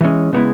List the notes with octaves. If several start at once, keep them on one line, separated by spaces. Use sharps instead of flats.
E3 G#3 C#4
C#3 G#3 B3 E4